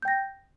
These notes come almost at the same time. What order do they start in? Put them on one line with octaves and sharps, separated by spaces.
G6 G5 A#6